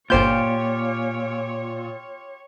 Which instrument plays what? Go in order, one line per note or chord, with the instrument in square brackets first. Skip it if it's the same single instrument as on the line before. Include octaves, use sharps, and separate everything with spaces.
[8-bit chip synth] G1 C5 G6 [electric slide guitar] A#2 [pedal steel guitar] F4 G4 [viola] C#5